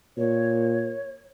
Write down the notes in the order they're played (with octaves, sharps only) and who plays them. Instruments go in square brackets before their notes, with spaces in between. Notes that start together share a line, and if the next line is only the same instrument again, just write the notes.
[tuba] A#2 [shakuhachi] C#5